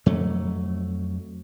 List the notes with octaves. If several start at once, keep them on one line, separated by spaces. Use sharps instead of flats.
F2 F#3 A3